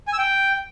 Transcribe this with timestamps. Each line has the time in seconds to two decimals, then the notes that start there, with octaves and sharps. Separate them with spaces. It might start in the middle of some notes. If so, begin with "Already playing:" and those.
0.08 G#5
0.13 E6
0.18 G5